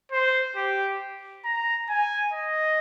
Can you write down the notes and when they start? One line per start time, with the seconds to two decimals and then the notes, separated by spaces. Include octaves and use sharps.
0.12 C5
0.56 G4
1.45 A#5
1.89 G#5
2.33 D#5